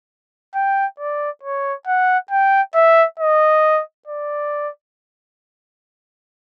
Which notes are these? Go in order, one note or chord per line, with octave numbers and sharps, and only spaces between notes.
G5
D5
C#5
F#5
G5
E5
D#5
D5